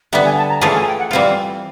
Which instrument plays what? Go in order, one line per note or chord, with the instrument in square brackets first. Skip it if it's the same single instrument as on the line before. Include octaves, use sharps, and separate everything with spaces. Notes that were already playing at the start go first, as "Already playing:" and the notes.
[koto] D3 G3 B3 [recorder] E5
[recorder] G#5
A5
A#5
[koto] E3 A3 C#4 F4 G#4 [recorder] A5
[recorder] G#5
G5
F#5
[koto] E3 G3 C4 F4 [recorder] F5